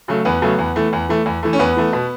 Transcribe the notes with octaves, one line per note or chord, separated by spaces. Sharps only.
C#3 F#3 A3
E2 B3
C#3 F#3 A3
E2
E3 A3
E2
E3 A3
E2
E3 A3
C#4
E2 B3
E3 A3
B2